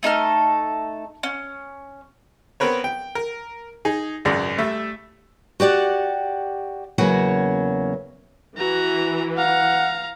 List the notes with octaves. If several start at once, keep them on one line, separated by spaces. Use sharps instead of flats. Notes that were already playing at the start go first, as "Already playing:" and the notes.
A3 D#4 A4 F6
C#4
B3 C4 A#4 B4 C#5
G5
A#4
D#4 G#4
G#1 C#2 F#2 G#3 D5
G3 A3 E5
F#4 G4 D5 F#5
E2 C#3 F#3 A#3 C#4 F#5
E3 F#4 A#5
F5 F#5 A#5